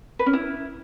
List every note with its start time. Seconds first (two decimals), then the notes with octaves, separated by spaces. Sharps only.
0.19 B4
0.26 C#4
0.33 E4